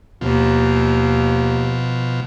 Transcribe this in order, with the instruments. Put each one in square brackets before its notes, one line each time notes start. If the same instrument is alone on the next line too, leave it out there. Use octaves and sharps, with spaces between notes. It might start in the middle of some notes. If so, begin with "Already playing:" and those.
[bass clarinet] D#2 [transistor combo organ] B2 F3